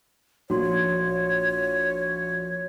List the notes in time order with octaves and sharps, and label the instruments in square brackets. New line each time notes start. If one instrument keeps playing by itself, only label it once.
[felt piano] A#1 [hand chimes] F#4 C6 [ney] C#5